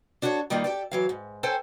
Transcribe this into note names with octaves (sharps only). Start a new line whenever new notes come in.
D4 F#4 A4 B4 C#5
D#3 G3 A#3 D#4 F4
G4 A4 D5
E3 F#3 F5
G#2
A4 C5 C#5 G5 G#5